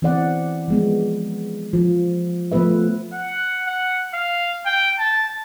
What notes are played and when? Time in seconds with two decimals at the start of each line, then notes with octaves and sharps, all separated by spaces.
0.02 E3 B3 C4 D5 F#5
0.68 F3 G#3 B3
1.73 F3
2.52 F3 A3 B3 B4 E5
3.13 F#5
3.67 F#5
4.14 F5
4.66 G5
4.99 A5